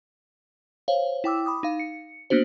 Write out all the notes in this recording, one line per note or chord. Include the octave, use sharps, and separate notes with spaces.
C5 C#5 F5
E4 G5 D6 E6
B5 D6 D#6
D#4 F5
C#7
A#3 B3 D4 F#4 C5